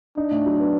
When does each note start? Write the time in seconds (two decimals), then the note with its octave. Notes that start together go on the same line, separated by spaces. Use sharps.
0.17 D4 D#4
0.31 A2
0.46 F#3
0.60 B3